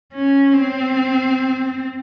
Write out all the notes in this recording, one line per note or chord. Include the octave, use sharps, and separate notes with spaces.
C#4
C4